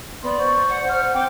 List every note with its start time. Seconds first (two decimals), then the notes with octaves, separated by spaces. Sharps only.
0.23 B3 D5 C6
0.38 C5 C#6
0.69 F#5
0.89 F6
1.14 C4 G5 D6